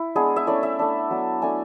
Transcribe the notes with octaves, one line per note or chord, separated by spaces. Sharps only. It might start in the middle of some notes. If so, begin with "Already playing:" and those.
Already playing: E4
G#3 B3 D4 G#4
E5
A3 C#4 E4 D5
E5
A3 D4
F#3 B3 D4
A3 D4 G#5